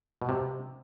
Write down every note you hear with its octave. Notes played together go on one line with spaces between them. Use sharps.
B2
C3